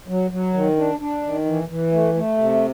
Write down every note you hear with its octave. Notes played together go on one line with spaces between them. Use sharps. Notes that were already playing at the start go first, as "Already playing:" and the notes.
F#3
F#3
D#3
D4
D4
D#3
E3
E3
A3
A3
C3